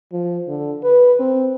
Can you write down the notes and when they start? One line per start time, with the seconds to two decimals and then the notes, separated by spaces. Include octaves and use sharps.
0.13 F3
0.48 D3
0.83 B4
1.19 C4